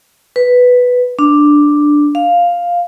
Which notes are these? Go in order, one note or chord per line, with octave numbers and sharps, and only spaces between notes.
B4
D4
F5